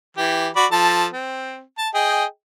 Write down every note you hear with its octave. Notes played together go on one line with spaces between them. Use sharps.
E3 G4
F#4 D5 B5
F3 A4 A5
C4
A5
G#4 D#5 G5